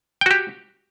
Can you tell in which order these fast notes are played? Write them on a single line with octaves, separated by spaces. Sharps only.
G5 F#4 G4